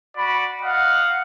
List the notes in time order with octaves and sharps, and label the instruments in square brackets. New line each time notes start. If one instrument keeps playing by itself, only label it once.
[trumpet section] F#4 D5 B5
D#5 F5 F#5